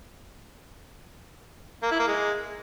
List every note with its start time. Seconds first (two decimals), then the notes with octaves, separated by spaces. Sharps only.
1.83 A#3
1.91 E4
1.99 A#3
2.08 G#3